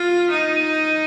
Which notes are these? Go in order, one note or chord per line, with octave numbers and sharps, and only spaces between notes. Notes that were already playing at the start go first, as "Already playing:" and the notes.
Already playing: F4
D#4